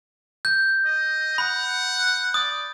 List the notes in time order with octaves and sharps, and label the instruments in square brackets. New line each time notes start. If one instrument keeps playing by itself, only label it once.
[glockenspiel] G6
[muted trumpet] D#5
[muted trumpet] F#5 [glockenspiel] B5
[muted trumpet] D5 [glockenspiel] D#6